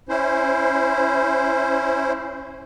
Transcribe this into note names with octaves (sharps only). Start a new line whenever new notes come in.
C#4 E4 C5